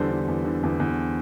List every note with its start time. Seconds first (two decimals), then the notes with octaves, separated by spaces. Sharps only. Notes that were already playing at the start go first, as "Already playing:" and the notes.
Already playing: E2 D3 G3 A4 C5
0.11 D3
0.28 E2
0.45 D3
0.63 E2
0.80 E2